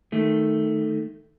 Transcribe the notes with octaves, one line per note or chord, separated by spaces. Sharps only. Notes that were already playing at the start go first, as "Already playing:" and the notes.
D#3 A3